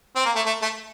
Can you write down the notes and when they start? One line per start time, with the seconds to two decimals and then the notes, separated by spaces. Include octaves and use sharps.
0.15 C4
0.25 A#3
0.36 A3
0.46 A3
0.62 A3